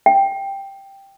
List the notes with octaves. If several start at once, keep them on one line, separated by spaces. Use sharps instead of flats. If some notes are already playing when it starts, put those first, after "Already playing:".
G5